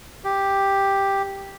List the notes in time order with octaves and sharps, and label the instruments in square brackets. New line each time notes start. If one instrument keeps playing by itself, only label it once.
[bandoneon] G4